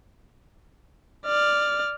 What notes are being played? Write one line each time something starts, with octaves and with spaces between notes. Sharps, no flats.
D5 F6